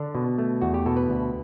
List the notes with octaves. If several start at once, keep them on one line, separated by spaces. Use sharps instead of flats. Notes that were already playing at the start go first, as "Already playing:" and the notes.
Already playing: D3 D4
B2
A3
E2 F#4
G4
B2 A4
B4
D2